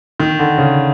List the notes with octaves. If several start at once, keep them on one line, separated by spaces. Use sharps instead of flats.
D#3
D3
C#3